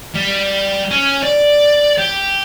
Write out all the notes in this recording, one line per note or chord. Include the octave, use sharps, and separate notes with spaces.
G3
C#4
D5
G4